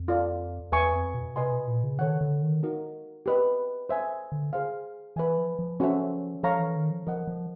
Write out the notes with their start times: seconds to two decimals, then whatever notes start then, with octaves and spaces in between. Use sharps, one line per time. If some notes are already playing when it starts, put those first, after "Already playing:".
Already playing: F2
0.08 F4 A4 D5 F5
0.72 E2 B4 E5 G#5 C#6
0.93 F2
1.14 B2
1.35 C3 B4 D#5 G#5 C6
1.52 B2
1.67 A#2
1.83 C#3
1.98 D#3 A4 C#5 F#5
2.21 D3
2.42 D#3
2.63 D#4 F#4 A#4
3.26 G4 B4 D#5
3.89 C5 E5 G#5
4.32 D3
4.53 G#4 C5 F5
5.16 E3 B4 E5 G#5
5.38 F3
5.59 F3
5.80 C#4 F#4 A4 C5 E5
6.43 F3 A4 C#5 F5 A#5 C#6
6.59 E3
6.76 D#3
6.91 F3
7.07 F3 A#4 D#5 F#5
7.27 F3